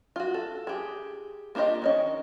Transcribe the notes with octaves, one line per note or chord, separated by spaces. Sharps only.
F4 F#4
A4
G4 G#4
A#3 D4 F4 G4 D#5
D#3 C#4 D#5